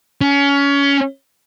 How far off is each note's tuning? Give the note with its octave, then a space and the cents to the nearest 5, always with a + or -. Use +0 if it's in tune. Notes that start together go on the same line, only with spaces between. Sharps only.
C#4 +25